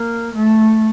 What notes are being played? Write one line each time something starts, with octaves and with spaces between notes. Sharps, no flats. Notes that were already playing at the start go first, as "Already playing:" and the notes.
Already playing: A#3
A3